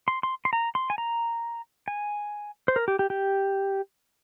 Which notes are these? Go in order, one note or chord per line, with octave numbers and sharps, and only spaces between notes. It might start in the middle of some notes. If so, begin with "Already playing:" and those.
C6
C6
C6
A#5
C6
G#5
A#5
G#5
C5
A#4
G4
G4
G4